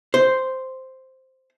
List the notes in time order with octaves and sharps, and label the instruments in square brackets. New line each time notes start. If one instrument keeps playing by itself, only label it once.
[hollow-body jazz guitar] C5